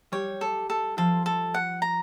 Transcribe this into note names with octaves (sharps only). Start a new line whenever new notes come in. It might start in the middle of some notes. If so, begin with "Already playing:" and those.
G3 G4 C#5
A4
A4
F3 F4 A4
A4
F#5
A#5